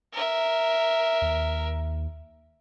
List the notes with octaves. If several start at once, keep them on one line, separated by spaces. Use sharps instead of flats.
A#4 E5
D#2